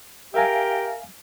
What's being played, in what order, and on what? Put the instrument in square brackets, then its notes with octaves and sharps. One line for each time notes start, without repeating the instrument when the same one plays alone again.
[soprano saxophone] G4 [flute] A#4 [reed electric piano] E5 F5 G#5